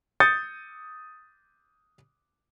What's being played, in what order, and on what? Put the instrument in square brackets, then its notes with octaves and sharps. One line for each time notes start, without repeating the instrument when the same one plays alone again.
[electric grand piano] D#6 G6 A6 C#7